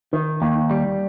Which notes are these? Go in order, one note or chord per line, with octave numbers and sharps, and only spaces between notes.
D#3
D#2
G3